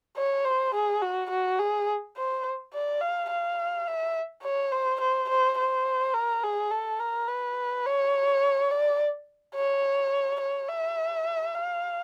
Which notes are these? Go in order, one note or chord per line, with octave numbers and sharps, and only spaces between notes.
C#5
C5
G#4
F#4
F#4
G#4
C5
D5
F5
F5
E5
C#5
C5
C5
C5
C5
A#4
G#4
A4
A#4
B4
C#5
D5
C#5
C#5
E5
F5